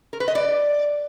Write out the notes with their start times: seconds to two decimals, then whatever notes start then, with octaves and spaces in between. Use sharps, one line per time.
0.13 A#4
0.20 B4
0.28 D#5
0.35 D5